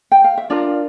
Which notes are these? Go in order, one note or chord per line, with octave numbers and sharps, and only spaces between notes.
G5
F5
E5
D4 F4 A#4 D5